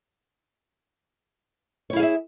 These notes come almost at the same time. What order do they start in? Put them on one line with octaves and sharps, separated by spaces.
C#5 E4 F5 G#4 E5